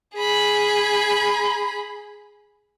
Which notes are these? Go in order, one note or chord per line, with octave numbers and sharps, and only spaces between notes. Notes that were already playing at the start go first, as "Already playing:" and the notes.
G#4 B5